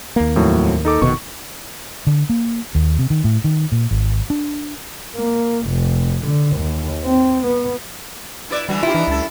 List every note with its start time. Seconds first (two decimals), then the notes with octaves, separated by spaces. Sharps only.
0.16 D#2 A#3
0.35 F2 A2 F#3
0.85 D#4 A4 D6
1.02 F1 B2 D#3 C#6
2.07 D3
2.30 A#3
2.75 D#2
2.99 C3
3.10 D#3
3.24 A2
3.44 D#3
3.72 A#2
3.91 G#1
4.30 D4
5.15 A#3
5.68 F1
6.25 D3
6.56 D#2
7.05 C4
7.46 B3
8.50 E4 B4 D5
8.69 D3 E3 G3 F#4
8.83 G2 A#3 E4 F4 G4
8.95 E3 D4 D#4
9.08 C#2 F#2 A4